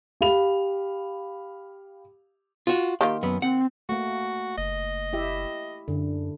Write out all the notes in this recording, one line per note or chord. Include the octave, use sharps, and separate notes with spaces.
G4 F5 B5 F7
F4 F#4
D#3 A#3 F4 G4
F#2 B3
C4 F#5
A3 A#3 F#4
F#1 D#5
E4 G4 E5
F#2 D3